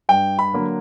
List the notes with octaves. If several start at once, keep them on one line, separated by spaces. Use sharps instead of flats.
G2 G5
B5
D3 F#3 A#3